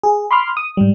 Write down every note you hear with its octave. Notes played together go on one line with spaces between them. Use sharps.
G#4
B5 C6 D6 F6
D#6
G#2 G3